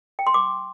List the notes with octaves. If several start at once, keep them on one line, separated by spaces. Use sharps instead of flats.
G5
C6
D6